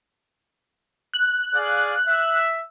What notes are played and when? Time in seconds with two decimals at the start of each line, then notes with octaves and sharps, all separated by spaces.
1.14 F#6
1.54 G#4 D5 F5
2.06 E5